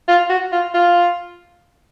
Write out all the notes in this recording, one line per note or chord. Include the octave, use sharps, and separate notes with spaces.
F4
F#4
F4
F4